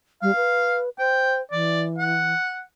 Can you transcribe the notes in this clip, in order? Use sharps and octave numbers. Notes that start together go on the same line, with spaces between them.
G3 F5
B4
C5 G5
E3 D5
F#5